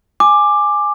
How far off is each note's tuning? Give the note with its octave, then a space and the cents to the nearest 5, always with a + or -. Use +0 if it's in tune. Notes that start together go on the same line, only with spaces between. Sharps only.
G#5 +0 D6 +10